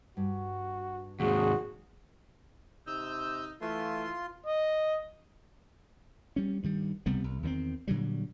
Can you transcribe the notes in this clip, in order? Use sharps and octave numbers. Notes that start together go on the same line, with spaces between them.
G2 F#4
D#2 G#2 F#4 G#4
C3 D#4 E6 G6
E3 A3 F4 C6
D#5
G3 C#4
G2 D#3 G3
C#2 C3 G3 B3
C2
E2 D#3 A#3 C4
A#2 D3 F#3 G3